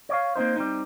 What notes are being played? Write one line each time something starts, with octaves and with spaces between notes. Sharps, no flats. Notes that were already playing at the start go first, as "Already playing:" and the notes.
C#5 D5 F5
A#3 C4 D4 D#4 C5
G3 C4 D#4